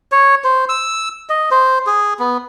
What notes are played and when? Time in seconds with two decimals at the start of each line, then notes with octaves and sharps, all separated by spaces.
0.12 C#5
0.44 C5
0.69 E6
1.29 D#5
1.51 C5
1.87 G#4
2.19 B3